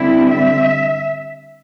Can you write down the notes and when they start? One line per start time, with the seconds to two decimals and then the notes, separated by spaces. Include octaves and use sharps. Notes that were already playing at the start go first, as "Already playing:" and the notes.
Already playing: D3 G3 C4 E4
0.29 E5